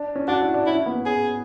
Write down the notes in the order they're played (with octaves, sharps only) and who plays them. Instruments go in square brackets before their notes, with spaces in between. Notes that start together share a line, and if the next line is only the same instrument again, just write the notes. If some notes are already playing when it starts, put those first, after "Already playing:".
Already playing: [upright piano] D4
C#4
[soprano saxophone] D4 [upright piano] F#4
[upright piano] E4
D4
[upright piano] C#4 [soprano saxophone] E4
[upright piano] B3
[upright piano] C#4 [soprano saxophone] G#4